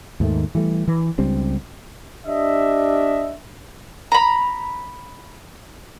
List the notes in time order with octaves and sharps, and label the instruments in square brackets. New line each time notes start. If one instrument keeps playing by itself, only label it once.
[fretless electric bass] D#2 G#2 D#3 A3
E3 G3 A3
E3
C#2 G3 C4 D4
[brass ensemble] D4 G4 D#5 E5
[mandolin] A#5 B5